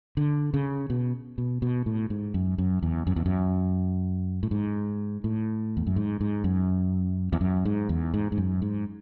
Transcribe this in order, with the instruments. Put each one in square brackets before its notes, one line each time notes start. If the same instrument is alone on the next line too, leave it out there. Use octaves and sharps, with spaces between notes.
[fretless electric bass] D3
C#3
B2
B2
B2
A2
G#2
F#2
F#2
E2
F#2
E2
F#2
A2
G#2
A2
E2
F#2
G#2
G#2
F#2
E2
F#2
G#2
E2
G#2
G#2
F#2
G#2